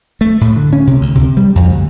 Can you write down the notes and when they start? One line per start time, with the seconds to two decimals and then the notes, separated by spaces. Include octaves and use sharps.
0.21 A3
0.41 A2
0.56 D3
0.73 C#4
0.87 C3
1.01 D2
1.15 C3
1.37 G3
1.56 F2
1.69 D2